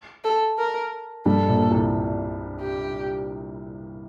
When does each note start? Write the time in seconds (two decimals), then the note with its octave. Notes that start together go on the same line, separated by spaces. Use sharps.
0.24 A4
0.58 A#4
1.25 G2 G3 A4
1.48 A#1 A#2
1.71 C2 C3
2.61 G4